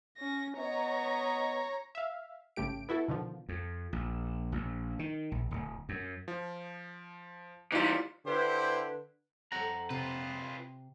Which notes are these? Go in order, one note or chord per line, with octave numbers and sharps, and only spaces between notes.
C#4 A#6
B3 C#5 D#5 A#5
E5 F5
G#1 C#3 A3 G4 D7
B3 E4 F#4 A4
B2 D3 D#3 F3
F2
A#1
A#1
D#3
A#1
D1
F#2
F3
E3 G3 D#4 F4
D3 E4 G4 B4 C5
F2 C4 A4 F#5 A#5
C3 C4 F4 B4